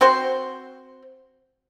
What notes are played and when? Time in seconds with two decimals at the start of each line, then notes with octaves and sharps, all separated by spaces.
0.01 C4 F#4 C5